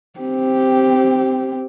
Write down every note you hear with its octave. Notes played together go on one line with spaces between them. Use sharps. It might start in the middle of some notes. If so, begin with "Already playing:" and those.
C4 G4